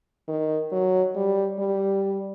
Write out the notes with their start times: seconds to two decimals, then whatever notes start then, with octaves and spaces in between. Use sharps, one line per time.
0.28 D#3
0.72 F#3
1.16 G3
1.59 G3